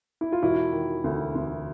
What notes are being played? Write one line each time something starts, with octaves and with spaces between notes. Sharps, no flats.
E4
F4
E1 E4 F#4
D#3
D2
D2